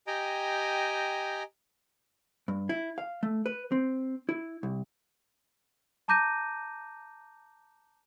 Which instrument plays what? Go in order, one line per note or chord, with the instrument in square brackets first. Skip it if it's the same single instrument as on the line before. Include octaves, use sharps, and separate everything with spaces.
[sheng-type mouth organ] G4 D#5 G5 G#5 A#5
[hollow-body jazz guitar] G2
E4
F5
A3
B4
C4
E4
C2
[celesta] A5 A#5 D6 G6 A#6 D#7